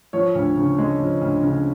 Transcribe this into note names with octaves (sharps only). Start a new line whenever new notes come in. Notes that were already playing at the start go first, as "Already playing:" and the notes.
F3 C#5
D2
C#3
G#3
F3
D2
C#3